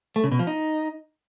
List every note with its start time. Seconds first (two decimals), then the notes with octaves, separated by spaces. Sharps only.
0.16 A3
0.24 C#3
0.32 B2
0.39 F3
0.47 D#4